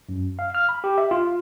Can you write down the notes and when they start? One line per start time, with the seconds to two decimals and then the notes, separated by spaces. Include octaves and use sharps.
0.09 F#2
0.39 F5
0.55 F6
0.69 B5
0.84 G4
0.98 E5
1.11 F4